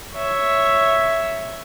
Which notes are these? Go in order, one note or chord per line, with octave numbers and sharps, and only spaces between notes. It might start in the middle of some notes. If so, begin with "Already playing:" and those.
C#5 E5